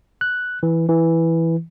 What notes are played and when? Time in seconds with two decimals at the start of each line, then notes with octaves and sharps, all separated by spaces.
0.21 F#6
0.63 E3
0.89 E3